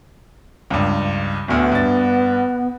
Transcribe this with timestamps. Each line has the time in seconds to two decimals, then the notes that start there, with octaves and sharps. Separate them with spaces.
0.70 C#2 G2
1.48 D1 D2 B3
1.72 G2 A6